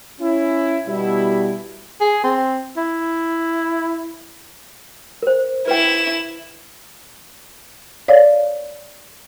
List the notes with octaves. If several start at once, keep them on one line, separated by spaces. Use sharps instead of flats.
C#4 E4
B2 G3 E4
G#4
C4
E4
A#4 C5
E4 B4 G5 E7
C#5 D5 F5